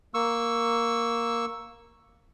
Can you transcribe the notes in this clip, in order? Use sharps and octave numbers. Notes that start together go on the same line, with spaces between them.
A#3 C#6 E6